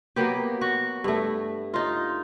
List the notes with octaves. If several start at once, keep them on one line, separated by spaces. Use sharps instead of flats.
F#3 A#3 B3 G4
F#4
G2 A3
D#4 F4